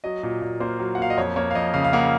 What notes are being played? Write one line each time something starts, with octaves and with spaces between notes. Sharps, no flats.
F#3 D#5
A#2
A#2
A#3 C5
F#3
F#5
A#3 F5
D#5
F2 C#5
A#3 C#5
F5
F2 D#5
C#3 F5
F5
A#3 F#5